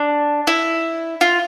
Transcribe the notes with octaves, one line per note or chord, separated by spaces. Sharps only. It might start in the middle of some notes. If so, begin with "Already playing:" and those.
Already playing: D4
E4
F4